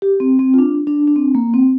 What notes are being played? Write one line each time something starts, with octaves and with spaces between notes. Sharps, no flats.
G4
C4
C4
F4
D4
D4
D4
C4
A#3
C4